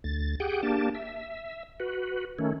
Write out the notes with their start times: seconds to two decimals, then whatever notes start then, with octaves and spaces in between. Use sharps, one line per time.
0.04 D2 A6
0.40 G4 G#4 F#5 G5
0.63 A#3 D4 G4 A5
0.95 E5
1.80 F#4 B4
2.39 D#3 A3 C#4